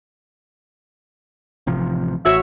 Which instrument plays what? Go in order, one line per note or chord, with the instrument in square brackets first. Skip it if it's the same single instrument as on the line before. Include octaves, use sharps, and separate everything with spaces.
[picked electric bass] A1 C3 F3
[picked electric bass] A1 [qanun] F#4 C#5 [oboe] E5